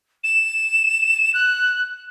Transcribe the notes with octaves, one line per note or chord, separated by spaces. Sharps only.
E7
F#6